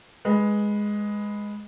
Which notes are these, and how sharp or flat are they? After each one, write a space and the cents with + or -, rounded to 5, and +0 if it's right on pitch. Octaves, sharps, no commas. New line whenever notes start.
G#3 +0 B4 +0